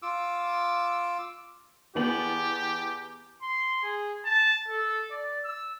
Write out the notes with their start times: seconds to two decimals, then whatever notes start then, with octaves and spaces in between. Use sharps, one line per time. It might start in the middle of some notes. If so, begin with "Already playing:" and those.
0.02 F4 D6 E6
1.95 E2 B3 G4 F#7
3.42 C6
3.82 G#4
4.25 A5
4.68 A4
5.11 D5
5.45 E6